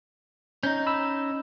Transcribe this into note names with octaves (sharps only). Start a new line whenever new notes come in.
C#4 D#4 G6
B5 E6